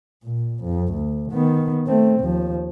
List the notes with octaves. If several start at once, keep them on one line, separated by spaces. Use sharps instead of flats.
A#2
F2
D2
D#3 B3
A3 C4
D#2 F3